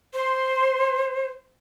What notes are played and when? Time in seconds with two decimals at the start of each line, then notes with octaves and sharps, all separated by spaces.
0.14 C5 C6